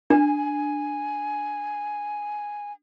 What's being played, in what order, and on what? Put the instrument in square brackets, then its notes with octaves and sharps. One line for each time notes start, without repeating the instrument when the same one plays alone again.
[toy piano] D4 [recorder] G#5